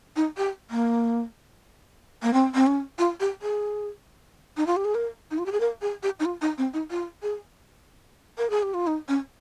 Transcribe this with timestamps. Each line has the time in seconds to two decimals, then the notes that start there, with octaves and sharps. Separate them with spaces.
0.16 D#4
0.37 G4
0.70 A#3
2.23 A#3
2.33 C4
2.55 C4
2.67 C#4
2.99 F4
3.20 G4
3.42 G#4
4.57 D#4
4.67 F4
4.76 G4
4.85 G#4
4.95 A#4
5.31 D#4
5.38 F4
5.46 G4
5.52 G#4
5.60 A#4
5.82 G#4
6.03 G4
6.20 D#4
6.25 F4
6.41 D#4
6.58 C4
6.74 D#4
6.91 F4
7.23 G#4
8.38 A#4
8.50 G#4
8.63 G4
8.74 F4
8.87 D#4
9.08 C#4